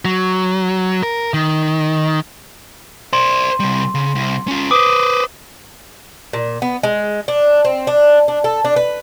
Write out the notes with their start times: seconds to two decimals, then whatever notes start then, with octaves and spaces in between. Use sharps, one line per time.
0.05 F#3
1.03 A#4
1.34 D#3
3.13 C5 D5 C6
3.60 C3 G3
3.95 C#3
4.15 C2
4.48 C#4 F4
4.71 B4 C5 D6 D#6 D7
6.33 A#2
6.62 B3
6.83 G#3
7.28 D4
7.65 C4
7.87 D4
8.28 D4
8.44 A4
8.64 D4
8.76 B4